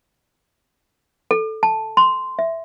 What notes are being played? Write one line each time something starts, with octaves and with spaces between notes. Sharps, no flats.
A4
A5
C6
E5